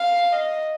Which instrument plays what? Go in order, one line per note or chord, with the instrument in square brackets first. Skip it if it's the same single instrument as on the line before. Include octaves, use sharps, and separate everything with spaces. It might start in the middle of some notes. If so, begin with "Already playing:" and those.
Already playing: [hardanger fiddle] F5
D#5